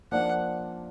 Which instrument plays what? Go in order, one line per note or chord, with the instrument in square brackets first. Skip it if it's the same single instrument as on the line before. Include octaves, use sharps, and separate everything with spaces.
[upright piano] F3 A#3 D4 [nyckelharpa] F#5